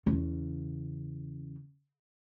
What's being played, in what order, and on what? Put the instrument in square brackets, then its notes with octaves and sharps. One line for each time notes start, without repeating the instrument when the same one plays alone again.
[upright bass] E2 C#3